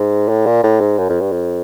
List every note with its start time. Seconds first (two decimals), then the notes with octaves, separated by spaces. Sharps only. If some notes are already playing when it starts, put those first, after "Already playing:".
Already playing: G#2
0.28 A2
0.46 A#2
0.63 A2
0.80 G#2
0.98 F#2
1.09 F2
1.21 G2
1.32 F2